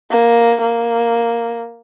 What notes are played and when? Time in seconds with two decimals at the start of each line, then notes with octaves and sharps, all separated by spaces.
0.11 A#3
0.62 A#3